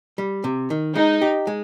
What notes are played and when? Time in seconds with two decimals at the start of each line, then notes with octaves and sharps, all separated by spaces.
0.18 G3
0.44 C3
0.70 D#3
0.96 G#3 D#4
1.22 G4
1.47 G#3